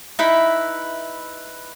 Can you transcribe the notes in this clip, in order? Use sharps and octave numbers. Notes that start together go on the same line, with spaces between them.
D#4 E4 B4 E5